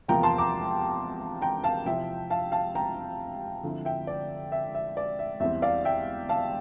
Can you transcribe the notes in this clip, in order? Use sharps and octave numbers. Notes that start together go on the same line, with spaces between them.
E2 C3 F3 A#3 F4 G5 A#5
A5 C6
A#5 D6
G5 A#5
F5 A5
C3 F3 C4 E4 E5 G5
F5 A5
F5 A5
G5 A#5
D3 F3 C4 E4
E5 G5
D5
E5
E5
D5
E5
E2 E3 G3 C4 E5
D5 F5
E5 G5
F5 A5